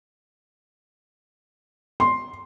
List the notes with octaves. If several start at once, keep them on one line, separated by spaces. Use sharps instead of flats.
C6